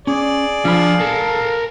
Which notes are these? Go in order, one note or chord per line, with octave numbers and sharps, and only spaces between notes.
C#4 G#4 D5
F3 D4 F5 B5
A4 A#4 A5